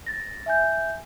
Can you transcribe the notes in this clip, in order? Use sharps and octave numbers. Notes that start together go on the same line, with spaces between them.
A6 A#6
E5 G#5 G6